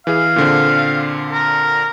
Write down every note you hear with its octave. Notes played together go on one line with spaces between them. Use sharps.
E3 G#4 F5
A#2 D3 C4
A#4